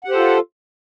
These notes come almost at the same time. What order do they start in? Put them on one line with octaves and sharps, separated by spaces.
F#5 G4 C5 A4 F4